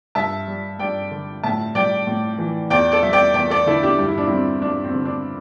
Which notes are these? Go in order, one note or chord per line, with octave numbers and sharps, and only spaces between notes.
G2 E5 A5
G3
G2 D5 G5
D3
A2 E5 A5
G3 D5 G5
A2
E3
E2 D5 G5
A4 D5
G3 E5
D5 G5
E2 D5 G5
A4 D5
D3 E4 A4
D4 G4
G2 G4
E4
D4
G3 C4 E4
G2 D4
C4
D3
D4